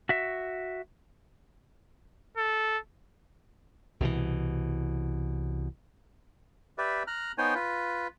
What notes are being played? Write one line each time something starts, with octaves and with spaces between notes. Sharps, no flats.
F#4 E5
A4
C2 B2 D3 E3
G4 B4 D5 E5
A#5 F6 F#6
B3 D#4 C5 C#5 G5 G#5
F4 B4